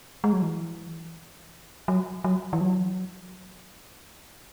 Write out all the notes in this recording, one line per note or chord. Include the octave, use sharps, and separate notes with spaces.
G#3
F#3
E3
F#3
F#3
E3
F#3